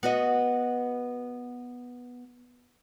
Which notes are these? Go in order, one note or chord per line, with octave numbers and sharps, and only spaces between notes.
B3 F#4 D#5